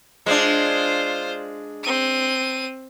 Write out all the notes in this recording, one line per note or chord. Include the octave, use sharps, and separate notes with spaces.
G#3 D4 F4 C5
C4 D#7